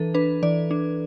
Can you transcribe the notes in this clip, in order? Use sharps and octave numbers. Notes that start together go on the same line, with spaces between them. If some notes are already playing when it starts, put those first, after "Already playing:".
Already playing: E3 D4 A4 B4
D4 B4
E3 D5
D4